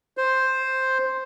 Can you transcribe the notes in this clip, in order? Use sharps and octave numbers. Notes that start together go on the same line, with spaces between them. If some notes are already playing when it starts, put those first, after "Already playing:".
C5